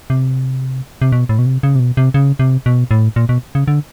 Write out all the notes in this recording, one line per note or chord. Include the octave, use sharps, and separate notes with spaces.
C3
C3
B2
A2
B2
C3
C#3
C3
B2
C3
C#3
C3
B2
A2
A#2
B2
C#3
D3